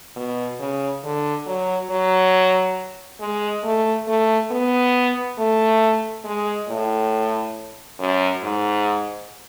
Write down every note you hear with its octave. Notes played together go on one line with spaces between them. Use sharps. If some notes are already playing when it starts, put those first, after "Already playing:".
B2
C#3
D3
F#3
F#3
G#3
A3
A3
B3
A3
G#3
A2
F#2
G#2